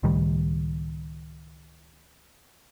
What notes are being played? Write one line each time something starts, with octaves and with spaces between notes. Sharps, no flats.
C#2 A2 D#3 G3